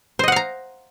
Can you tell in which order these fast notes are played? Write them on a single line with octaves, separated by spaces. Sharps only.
C5 D#5 F#5 F5 A#5